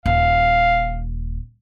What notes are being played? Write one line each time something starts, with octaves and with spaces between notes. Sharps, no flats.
D#1 F5